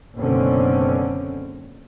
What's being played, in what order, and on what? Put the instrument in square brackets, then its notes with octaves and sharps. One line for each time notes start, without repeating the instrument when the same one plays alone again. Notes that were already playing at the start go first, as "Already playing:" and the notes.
[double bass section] F#1 B2 D3 C4 C#4